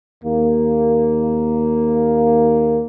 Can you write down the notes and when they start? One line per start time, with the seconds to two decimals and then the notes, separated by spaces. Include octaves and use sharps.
0.24 D#2 A#3